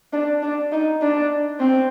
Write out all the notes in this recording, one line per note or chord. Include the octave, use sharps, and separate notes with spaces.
D4
D4
D#4
D4
C4